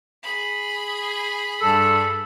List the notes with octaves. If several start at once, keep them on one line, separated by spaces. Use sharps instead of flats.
G#4 B5
G2 G3 A4